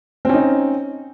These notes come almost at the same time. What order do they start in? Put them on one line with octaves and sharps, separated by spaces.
C4 C#4 D#4